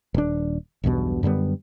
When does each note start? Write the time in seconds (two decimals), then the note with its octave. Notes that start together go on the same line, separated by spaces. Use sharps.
0.14 D#1 D4
0.84 B1 E2 G2 B2
1.23 F#2 D3 G3 B3